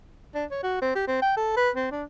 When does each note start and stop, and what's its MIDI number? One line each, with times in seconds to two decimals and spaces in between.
0.35 0.45 62
0.51 0.61 73
0.63 0.80 66
0.82 0.93 60
0.95 1.03 67
1.08 1.22 60
1.22 1.34 79
1.37 1.53 69
1.57 1.70 71
1.76 1.89 60
1.92 2.04 62